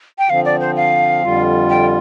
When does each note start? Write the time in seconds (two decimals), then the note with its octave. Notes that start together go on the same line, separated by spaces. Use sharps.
0.18 G5
0.30 D3 F3 C4 F5
0.45 D5
0.60 C5
0.76 F5
1.24 F2 D3 G3 F4
1.70 G5